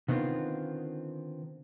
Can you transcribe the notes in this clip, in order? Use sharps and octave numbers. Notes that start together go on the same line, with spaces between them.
D3 D#3 B3 C4 F4